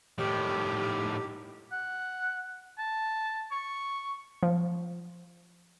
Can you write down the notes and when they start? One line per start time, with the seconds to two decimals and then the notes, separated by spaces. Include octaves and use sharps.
0.18 A2 D#3 G4
1.72 F#5
2.78 A5
3.52 C#6
4.43 F3